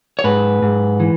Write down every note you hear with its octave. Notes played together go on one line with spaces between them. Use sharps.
C#5
G#2 B4
G#2
E3